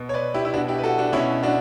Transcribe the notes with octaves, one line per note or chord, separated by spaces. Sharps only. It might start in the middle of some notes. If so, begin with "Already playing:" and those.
Already playing: B2
C#5
B4 D5
E4 G4
E4
B2 D4 F#4
E4 G4
B4
F#4 A4
D4 F#4
B2 C#4 E4
D4 F#4